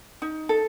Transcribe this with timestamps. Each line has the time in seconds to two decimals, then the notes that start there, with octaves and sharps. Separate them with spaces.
0.22 D#4
0.49 A4